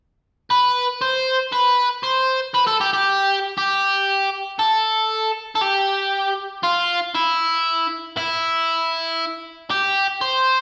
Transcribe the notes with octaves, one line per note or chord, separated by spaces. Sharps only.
B4
C5
B4
C5
B4
A4
G4
G4
G4
A4
A4
G4
F4
E4
E4
G4
C5